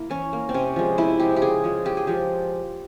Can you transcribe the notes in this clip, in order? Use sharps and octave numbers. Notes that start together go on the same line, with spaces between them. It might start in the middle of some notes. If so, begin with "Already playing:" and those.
Already playing: A#3 E4
E3 C#4
A#3
C4
C3 C#4
F3 G#3
C3 E4
F3 G#3 G4
G4
C#3 G#4
F3 G#3
C#3 G4
G#4
F3 G#3 G4